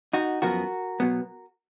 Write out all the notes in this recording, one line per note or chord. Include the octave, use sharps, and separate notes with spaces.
D#4 F#4
F#2 F3 B3 F#4 A#4
B2 F#3 B3